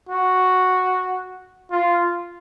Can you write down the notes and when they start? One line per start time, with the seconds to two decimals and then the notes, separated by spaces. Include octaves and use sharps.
0.09 F#4
1.71 F4